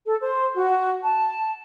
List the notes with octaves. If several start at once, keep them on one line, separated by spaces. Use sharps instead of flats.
A4
C5
F#4
A5